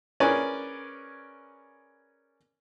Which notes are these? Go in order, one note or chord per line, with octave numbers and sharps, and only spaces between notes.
C#4 G#4 A#4 B4 D5 G#5